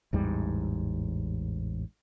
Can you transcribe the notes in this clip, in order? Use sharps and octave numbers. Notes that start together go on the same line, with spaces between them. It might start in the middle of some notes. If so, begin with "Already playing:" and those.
A1 E2 G#2 G3